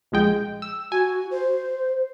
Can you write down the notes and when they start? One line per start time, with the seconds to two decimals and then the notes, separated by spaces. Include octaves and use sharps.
0.12 A#1 G#3 G5
0.62 E6
0.92 F#4 G#5
1.31 C5